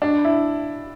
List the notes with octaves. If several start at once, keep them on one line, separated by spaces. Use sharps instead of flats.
D4
E4